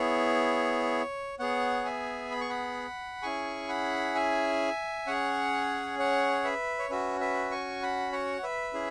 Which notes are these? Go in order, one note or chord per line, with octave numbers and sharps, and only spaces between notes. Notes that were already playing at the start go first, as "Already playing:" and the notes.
Already playing: B3 E4 G#4 C#5
B3 G#4 C#5 F#5
E5 G#5
B5
C#6
F#5 B5
C#4 E4 G#4 G#5 C#6
F#5 B5
E5 G#5
C#4 G#4 C#5 F#5
C#5 F#5
B4 E5
C#5
C#4 F#4 B4 E5
B4 E5
G#5 C#6
F#5 B5
C#5 F#5
B4 E5
C#4 E4 G#4